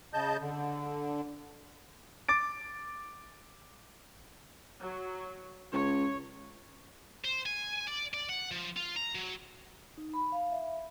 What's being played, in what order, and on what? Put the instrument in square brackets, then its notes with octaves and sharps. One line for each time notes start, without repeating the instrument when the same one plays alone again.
[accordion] C#3 D#5 A5 G6
D3
[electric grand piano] D6 A6 D7
[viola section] F#3
[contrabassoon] C#2 [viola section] C#5
[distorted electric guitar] C5
G#5
D5
D5
F#5
F3
F4
A#5
F#3
[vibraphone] D#4
B5
F5
E5